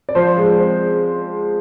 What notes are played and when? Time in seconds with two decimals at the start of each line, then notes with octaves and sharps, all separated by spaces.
0.09 D5
0.15 F3 C5
0.37 G#3
0.59 C4